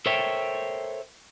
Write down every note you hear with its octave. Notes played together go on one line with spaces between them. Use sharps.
A4 A#4 C5 C#5 E5 G5